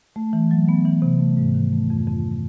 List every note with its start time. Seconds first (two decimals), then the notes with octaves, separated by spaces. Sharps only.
0.16 A3
0.33 E3
0.51 F#3
0.69 B3
0.85 E3
1.02 C3
1.20 A3
1.37 G#2
1.54 D#3
1.72 A3
1.90 F2
2.07 F2